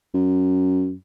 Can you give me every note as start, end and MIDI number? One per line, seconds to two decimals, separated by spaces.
0.14 0.93 42